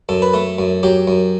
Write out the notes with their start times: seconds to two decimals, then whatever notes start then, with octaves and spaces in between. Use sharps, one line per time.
0.09 F#2 A4
0.22 B4
0.33 A3 A4
0.58 F#2
0.83 F#3 G4
1.08 F#2